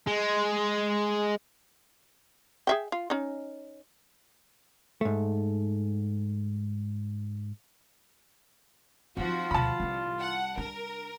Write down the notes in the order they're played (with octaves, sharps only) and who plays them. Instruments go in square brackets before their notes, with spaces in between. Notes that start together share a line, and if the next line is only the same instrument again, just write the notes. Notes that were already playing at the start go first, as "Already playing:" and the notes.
[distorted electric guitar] G#3
[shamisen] G#4 E5 G5
F4
C#4 D#4
[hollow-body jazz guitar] G#2 A3
[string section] F3 F#4 [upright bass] C4 D#4 [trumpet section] F4
[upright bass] D2 B2 [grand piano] A5 B5
[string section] C2 [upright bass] E3 D4
[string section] F#5
[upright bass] D4 [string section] A#4